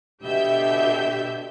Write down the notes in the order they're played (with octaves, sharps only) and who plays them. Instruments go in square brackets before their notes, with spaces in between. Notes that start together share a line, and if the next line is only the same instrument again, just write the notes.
[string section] B2 D3 G4 E5 G6